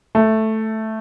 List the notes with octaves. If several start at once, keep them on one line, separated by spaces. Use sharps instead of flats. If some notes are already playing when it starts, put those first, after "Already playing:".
A3